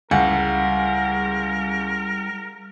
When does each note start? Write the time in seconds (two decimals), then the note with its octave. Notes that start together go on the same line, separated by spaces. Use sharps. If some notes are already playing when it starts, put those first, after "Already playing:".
0.11 C#2 G3 E4 G#4 A#4 F#5